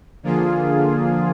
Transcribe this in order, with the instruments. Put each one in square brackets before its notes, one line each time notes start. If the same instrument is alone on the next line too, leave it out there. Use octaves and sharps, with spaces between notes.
[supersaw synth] D3 F3 A#3 F4 G#4